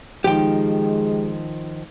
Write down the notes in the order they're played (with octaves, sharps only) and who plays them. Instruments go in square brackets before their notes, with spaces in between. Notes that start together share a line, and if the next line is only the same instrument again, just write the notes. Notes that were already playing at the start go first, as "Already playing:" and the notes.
[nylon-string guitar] D#3 F3 [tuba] G#3 [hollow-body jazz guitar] G4 G5